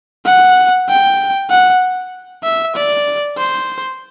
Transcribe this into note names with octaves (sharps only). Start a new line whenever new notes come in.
F#5
G5
F#5
E5
D5
C5